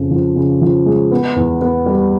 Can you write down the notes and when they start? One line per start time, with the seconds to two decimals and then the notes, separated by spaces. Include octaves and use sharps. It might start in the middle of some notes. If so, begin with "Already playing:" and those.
Already playing: F2 C#3
0.11 F3
0.36 C#3
0.62 F3
0.86 G#3
1.12 B3
1.36 E2
1.62 B3
1.86 G3